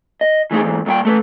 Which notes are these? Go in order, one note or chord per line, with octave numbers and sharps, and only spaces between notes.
D#5
E3 A3 D#4 G#4
E2 G#2 E3
A#2 G3 C#5 G5
A3 A4 B4